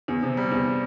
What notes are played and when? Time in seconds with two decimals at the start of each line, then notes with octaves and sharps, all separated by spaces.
0.08 E2
0.23 C3
0.37 G3
0.52 E2